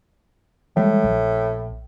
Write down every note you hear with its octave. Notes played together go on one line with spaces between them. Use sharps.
A2 E3 G3 G#3
A#1